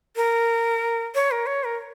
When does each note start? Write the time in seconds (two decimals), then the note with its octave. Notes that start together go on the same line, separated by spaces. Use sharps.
0.16 A#4
1.15 C#5
1.31 A#4
1.46 C#5
1.64 A#4